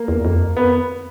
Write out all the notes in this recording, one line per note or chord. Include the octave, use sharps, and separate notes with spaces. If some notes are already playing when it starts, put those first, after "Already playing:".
Already playing: A#3
E2
F2
B3